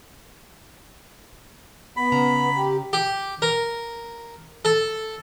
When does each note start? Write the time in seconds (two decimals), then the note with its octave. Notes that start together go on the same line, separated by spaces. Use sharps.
1.97 B3 B5
2.12 C#3 A#5
2.56 G4
2.93 G4
3.42 A#4
4.65 A4